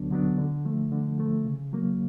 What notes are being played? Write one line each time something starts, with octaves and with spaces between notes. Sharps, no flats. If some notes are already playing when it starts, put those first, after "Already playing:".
Already playing: D2 D3 F#3 B3 D4
D3 F#3 B3 D4
D3
F3 A3
D3
F3 A3
C#3
F#3 A#3